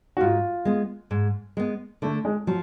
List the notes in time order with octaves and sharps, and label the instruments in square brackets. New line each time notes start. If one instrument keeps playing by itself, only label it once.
[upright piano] F#4
[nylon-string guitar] G#2 [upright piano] F4
[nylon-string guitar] G#3 B3
G#2
G#3 B3
[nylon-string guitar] D3 [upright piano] A3
[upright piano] G#3
[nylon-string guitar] F3 [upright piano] F#3